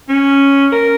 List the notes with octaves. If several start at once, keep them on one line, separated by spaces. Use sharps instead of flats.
C#4
A#4